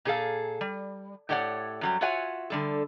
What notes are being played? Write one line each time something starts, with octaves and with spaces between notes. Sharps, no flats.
A#2 G#4 A4 F5
G3
A2 G4 A4 C#5 D5 F#5
F#2 F#3 G3
F4 F#4 C#5 E5 F#5 G#5
D3 G3 A4